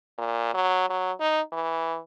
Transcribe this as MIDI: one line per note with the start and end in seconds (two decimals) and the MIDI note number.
0.18 0.51 46
0.54 0.85 54
0.90 1.12 54
1.20 1.41 63
1.52 1.98 52